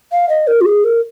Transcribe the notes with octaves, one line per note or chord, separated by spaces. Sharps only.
F5
D#5
A#4
F4
G#4
A#4